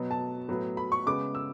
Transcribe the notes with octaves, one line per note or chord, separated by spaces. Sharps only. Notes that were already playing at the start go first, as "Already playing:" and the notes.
Already playing: B2 F#3 B3
A5
A2 F#3 B3
B5
C#6
C#3 G#3 B3 D6
E6